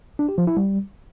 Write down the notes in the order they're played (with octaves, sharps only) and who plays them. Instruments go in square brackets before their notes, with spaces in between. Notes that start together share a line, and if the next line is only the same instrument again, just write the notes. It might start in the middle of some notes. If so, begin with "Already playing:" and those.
[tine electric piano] D4
G4
F3
E4
G3